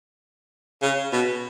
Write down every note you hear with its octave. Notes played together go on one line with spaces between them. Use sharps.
C#3
B2